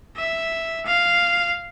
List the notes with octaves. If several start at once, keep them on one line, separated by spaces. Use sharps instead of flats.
E5
F5